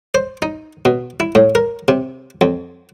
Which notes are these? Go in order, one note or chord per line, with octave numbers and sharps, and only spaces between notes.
C5
D#4
B2
E4
A2
A#4
C3
F2